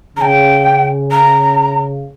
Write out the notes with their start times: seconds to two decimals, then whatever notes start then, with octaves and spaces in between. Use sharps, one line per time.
0.17 C#3 G5 A#5
1.11 A#5